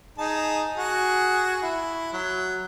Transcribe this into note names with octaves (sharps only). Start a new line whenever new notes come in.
D#4 G#4 A5
F#4 G#4
E4
F#3